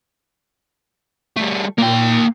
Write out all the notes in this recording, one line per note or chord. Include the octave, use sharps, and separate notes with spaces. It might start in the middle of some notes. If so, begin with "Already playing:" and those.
G3 A3
A#2 A#3 G5